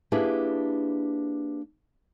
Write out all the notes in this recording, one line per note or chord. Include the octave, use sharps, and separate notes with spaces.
A#3 D4 E4 G4 G#4 B4